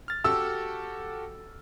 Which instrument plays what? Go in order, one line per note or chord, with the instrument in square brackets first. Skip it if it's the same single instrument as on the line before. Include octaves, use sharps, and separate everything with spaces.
[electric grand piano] F6 A6
[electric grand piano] F#4 G4 A4 [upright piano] E6